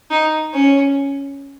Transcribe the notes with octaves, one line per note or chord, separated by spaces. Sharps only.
D#4
C#4